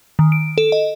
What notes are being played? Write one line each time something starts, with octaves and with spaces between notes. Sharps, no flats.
D#3
D7
A4
D#5